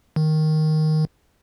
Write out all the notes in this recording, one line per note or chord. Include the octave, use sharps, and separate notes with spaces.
D#3